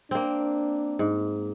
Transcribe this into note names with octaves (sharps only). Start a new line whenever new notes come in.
A#3 C4 D4
G#2